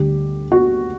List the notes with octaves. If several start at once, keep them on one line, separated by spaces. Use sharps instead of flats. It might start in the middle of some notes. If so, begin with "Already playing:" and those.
Already playing: D2 D3 G3 G4
F#4